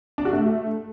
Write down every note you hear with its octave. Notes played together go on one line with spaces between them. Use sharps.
D4
F#4
A3